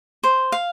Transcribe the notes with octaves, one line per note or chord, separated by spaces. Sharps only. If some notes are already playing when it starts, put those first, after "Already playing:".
C5
F5